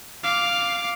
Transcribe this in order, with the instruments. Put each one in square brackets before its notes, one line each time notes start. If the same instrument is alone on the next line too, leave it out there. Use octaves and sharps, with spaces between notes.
[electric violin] F5 D6